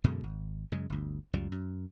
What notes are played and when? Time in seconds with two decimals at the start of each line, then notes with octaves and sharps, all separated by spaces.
0.04 F#2 B2 D3 G#3
0.24 G#1
0.72 F#2 C#3 G#3
0.90 G1 D2
1.33 C#2 F#2 F3 G3
1.52 F#2